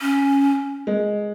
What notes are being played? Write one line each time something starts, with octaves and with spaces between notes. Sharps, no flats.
C#4
G#3